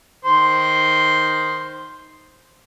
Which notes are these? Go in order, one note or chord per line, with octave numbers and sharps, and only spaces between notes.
D#3 C5 C6